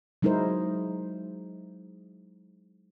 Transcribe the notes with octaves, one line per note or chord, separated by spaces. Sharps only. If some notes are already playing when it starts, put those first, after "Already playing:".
F#3 G#3 D#4 E4 A#4 C5